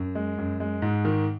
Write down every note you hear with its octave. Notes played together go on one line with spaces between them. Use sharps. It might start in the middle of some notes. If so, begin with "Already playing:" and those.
Already playing: F#2
G#3
F#2
G#3
G#2
D#3